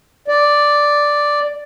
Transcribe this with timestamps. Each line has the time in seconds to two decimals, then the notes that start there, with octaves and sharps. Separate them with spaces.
0.28 D5